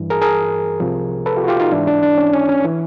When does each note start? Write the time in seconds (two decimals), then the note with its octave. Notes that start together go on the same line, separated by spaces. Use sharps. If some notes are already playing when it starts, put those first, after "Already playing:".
Already playing: G2 E3
0.10 G#4 A#4
0.21 G#4 A#4
0.80 C2 C3 F3
1.26 A4 B4
1.37 F4 G4
1.44 F#4
1.48 F4 G4
1.60 D#4 F4
1.72 G#2 E3 D4 E4
1.87 D4
2.03 D4
2.18 C#4
2.33 C#4
2.49 C#4
2.64 E3